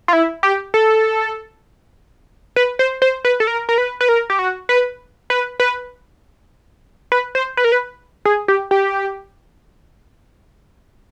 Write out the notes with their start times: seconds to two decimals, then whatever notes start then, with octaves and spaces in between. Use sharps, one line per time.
0.08 F4
0.13 E4
0.43 G4
0.74 A4
2.56 B4
2.79 C5
3.02 C5
3.25 B4
3.40 A4
3.47 A#4
3.69 A#4
3.78 B4
4.01 B4
4.09 A#4
4.30 G4
4.39 F#4
4.69 B4
5.30 B4
5.60 B4
7.12 B4
7.35 C5
7.57 B4
7.64 A#4
7.72 B4
8.25 G#4
8.48 G4
8.71 G4